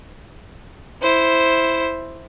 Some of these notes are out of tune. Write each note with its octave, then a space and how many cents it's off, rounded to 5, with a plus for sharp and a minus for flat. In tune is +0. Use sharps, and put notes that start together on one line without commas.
E4 +0 C5 +0